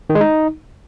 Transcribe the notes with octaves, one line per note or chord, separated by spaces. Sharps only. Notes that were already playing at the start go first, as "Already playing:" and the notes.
D#3
G#3
D#4